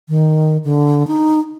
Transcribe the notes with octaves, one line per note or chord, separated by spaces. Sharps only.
D#3
D3
D#4